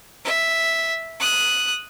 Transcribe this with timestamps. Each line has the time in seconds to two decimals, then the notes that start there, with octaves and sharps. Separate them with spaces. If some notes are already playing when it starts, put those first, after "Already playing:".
0.25 E5
1.20 D#6 F#6